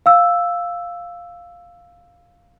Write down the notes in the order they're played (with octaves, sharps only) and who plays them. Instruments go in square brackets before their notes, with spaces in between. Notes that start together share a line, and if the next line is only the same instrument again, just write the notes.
[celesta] F5 E6